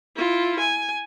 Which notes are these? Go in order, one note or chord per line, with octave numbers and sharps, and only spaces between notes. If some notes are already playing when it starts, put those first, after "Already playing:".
E4 F4
G#5